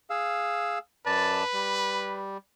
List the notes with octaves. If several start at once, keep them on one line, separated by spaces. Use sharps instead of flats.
G#4 F5 E6
F#2 B4 D5 A5
G3